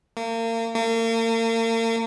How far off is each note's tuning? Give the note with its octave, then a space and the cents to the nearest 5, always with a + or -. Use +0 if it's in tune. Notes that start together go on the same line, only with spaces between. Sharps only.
A#3 -35
A#3 -40